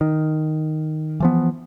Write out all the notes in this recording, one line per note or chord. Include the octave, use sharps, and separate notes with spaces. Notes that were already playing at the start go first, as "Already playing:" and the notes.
D#3
E3 F3 B3